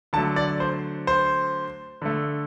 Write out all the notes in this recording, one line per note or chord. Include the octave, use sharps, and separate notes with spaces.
D3 F#3 A3 A5
D5
C5
C5
D3 A3